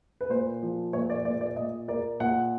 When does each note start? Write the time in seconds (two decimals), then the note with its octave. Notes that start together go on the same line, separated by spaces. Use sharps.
0.21 B4
0.30 A#2 C5
0.62 F3
0.93 A#2 C#5
1.10 D5
1.25 A#2 D5
1.41 D5
1.56 A#2 D#5
1.88 A#3 D5
2.20 A#2 F#5